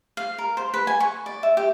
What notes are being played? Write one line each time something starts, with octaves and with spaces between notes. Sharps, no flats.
F5
A#4
C5
B4
G#5
C#6
D5
E5
G4